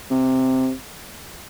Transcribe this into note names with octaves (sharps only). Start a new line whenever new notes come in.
C3